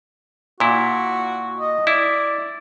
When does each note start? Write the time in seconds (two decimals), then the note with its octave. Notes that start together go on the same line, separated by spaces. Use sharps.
0.60 A#2 E4 F#4
1.60 D#5
1.87 E4 D5